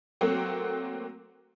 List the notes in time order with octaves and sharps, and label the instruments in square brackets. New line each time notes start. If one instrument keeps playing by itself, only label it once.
[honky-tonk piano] F#3 A3 A#3 C4 F#4